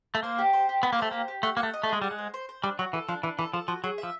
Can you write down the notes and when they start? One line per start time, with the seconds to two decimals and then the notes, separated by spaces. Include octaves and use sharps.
0.15 A3
0.23 A#3 C5
0.38 G4
0.53 C5
0.69 G4
0.83 B3 G4
0.93 A#3
0.99 A3 C5
1.11 A#3 G4
1.28 G4
1.43 A3 F#5
1.57 A#3 F#5
1.63 A3
1.74 D#5
1.84 A3
1.89 G#3 G#4
2.02 G3 F#5
2.11 G#3
2.18 C5
2.34 C5
2.49 C5
2.63 G3 D4
2.79 F#3 F#4
2.93 E3 A4
3.08 F3 D4
3.23 E3 D4
3.38 E3 A4
3.53 F3 A4
3.68 F3 F#4
3.84 F#3 G#4
3.98 E5
4.03 F3